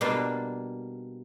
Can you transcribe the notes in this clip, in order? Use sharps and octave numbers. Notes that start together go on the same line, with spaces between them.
B2 G3 A#3 D4 F4